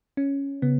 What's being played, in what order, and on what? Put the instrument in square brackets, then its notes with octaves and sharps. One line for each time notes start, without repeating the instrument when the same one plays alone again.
[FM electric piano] C#4
[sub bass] C#3 [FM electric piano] B3